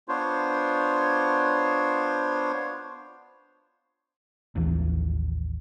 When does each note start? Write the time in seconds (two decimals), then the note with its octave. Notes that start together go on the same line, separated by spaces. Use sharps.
0.08 B3 D4 F4 C5 C#5
4.56 A1 D#2 E3 F3